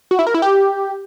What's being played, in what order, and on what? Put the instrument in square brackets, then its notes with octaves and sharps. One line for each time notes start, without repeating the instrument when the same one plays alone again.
[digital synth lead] F#4
E4
A#4
E4
G4